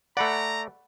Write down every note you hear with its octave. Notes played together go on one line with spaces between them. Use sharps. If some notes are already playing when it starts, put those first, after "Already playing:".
A3 D5 F#5 A#5 B5